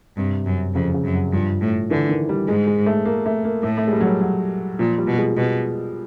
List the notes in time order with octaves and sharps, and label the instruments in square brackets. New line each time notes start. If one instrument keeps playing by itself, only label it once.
[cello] G2 [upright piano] C3
[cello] F#2
[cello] F2 [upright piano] C#3
[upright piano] C#3
[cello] F#2
[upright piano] F#3
[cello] G2 [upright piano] F3
[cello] A2
[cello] D3 [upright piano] E3
[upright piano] D#3
G3
[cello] G#2 [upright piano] G#3
[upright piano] G#3
A3
A#3
A3
A#3
[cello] A2 [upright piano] A3
[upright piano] A3
G#3
G3
F#3
G3
F#3
[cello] A#2 [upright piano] F3
[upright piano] G3
[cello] B2
[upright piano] G#3
[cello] B2 [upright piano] G#3